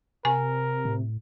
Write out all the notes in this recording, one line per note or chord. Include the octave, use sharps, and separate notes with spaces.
C3 A#4 G#5
A2